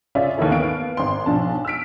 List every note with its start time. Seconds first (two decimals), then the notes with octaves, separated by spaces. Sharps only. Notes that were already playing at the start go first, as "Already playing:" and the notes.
0.15 C#3 C#4 F4 D5 E5
0.38 D#2 E3 A#3 E4 A4
0.51 B3 F5 D7
0.97 G#1 C6
1.26 B1 F3 D4 A5
1.65 E6 F6 B6 D7